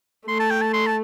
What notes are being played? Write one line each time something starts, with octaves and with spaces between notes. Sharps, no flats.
A3 C6
A5
G5
A5
C6
A5